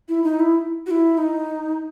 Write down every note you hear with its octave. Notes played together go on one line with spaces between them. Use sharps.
E4
D#4
E4
F#4
E4
D#4